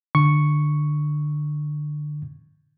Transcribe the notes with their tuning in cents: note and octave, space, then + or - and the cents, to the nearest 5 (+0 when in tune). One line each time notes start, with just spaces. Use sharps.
D3 +20 C#6 +0